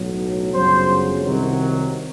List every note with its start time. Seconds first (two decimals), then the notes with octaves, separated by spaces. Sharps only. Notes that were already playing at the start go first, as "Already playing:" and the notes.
Already playing: B1 A2 F#3
0.53 G1 F#2 C#3 F#3 C5
1.22 C2 C3 D#3 F#3